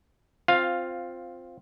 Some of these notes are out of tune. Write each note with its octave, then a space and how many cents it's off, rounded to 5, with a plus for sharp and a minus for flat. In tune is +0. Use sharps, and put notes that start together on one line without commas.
C4 +0 F4 +10 F5 +0